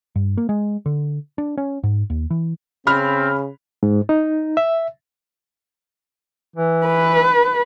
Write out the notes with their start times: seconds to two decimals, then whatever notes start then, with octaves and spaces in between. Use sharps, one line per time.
0.15 G2
0.37 A#3
0.49 G#3
0.86 D3
1.38 D4
1.57 C#4
1.83 G#2
2.10 D#2
2.30 E3
2.87 C#3 C4 B5 F6
3.83 G#2
4.09 D#4
4.57 E5
6.56 E3
6.86 B4